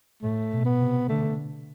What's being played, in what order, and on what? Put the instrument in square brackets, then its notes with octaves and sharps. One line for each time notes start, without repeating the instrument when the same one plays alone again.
[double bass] A2 [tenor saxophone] A3
[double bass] B2
[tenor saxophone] B3
[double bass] C3
[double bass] D3 [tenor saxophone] A3